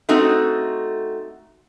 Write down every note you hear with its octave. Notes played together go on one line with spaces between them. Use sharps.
A3 C4 D#4 F#4